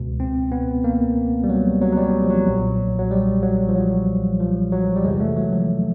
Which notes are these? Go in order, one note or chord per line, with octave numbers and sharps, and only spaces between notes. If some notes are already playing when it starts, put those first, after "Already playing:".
Already playing: C#2 B2
C4
B3
A#3
G3
F#3
F#3
F#3
G3
F3
F#3
B1 A#2
F#3
G3
F#3
F3
F#3
F3
F#3
G3
E2 C3 E3 G#3
A3
F#3
F3